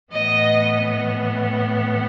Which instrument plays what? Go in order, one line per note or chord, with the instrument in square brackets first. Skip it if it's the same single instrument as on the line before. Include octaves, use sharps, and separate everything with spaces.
[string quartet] A2 E3 B3 D#5